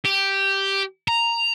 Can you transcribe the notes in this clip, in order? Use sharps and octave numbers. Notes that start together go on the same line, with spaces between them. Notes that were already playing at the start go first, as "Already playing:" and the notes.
G4
A#5